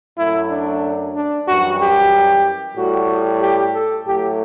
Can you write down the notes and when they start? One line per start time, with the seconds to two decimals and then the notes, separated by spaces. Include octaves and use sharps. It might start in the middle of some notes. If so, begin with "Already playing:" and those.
0.18 F#2 F#3 A3 E4
0.50 D4
1.15 D4
1.48 F#2 E3 G3 F#4
1.80 G4
2.76 A2 G3 F#4
3.41 G4
3.74 A4
4.06 A2 F#3 A3 G4